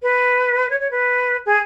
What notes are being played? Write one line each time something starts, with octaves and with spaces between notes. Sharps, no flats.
B4
C#5
C#5
B4
G#4